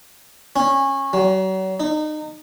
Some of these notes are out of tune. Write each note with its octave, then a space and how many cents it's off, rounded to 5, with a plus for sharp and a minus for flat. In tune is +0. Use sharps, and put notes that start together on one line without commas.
C#4 -20
F#3 +35
D#4 -30